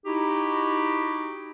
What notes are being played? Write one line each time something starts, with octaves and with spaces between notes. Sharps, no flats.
D#4 E4 F#4 G4